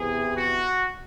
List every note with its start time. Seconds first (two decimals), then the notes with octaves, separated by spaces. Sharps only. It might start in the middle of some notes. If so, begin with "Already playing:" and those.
Already playing: E2 C3 E3 G#4
0.36 F#4